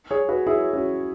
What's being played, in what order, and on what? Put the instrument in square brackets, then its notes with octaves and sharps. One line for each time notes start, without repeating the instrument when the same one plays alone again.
[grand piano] G#4 C#5
F#4 B4
E4 G#4
C#4 F#4